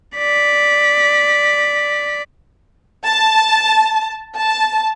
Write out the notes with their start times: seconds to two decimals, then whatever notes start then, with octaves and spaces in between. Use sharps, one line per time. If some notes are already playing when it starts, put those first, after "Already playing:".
0.17 D5 B6
3.04 A5
4.36 A5